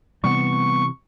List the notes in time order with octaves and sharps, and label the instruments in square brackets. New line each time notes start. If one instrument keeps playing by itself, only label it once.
[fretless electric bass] C3 E3 [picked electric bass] G3 B3 [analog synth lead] C#6